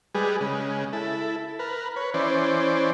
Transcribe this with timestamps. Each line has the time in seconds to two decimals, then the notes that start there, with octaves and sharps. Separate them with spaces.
0.15 G3 G#3 G#4 B4
0.41 C#3 G#3
0.93 E4 A4
1.59 A#4 B4
1.96 B4 C#5
2.14 E3 C#4 C5 D5